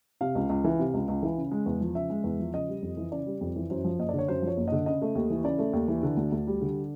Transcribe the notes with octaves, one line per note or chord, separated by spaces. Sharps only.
C3 F5
C#2
C#2
E3
C3
C#2
C#2
E3
C#3
G#3
E2
F3
C#3 E5
G#3
E2
F3
C#3 D#5
G3
F2
E3
C#3 D5
G3
F2
E3
F#2 C5
F3
F#1 D#5
D5
D3 C#5
F#2 C5
F3
C#5
F#1
D3 D#5
C#3 D#5
A3
D#2
E3
C#3 D5
A3
D#2
E3
D3
D2
D2
G3
D3